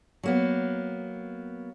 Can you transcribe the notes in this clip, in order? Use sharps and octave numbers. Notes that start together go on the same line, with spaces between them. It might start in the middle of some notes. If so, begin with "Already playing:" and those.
F#3 A#3 B3